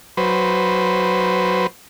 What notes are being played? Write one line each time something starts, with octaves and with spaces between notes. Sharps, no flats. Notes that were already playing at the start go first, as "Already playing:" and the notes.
F#3 B4 C5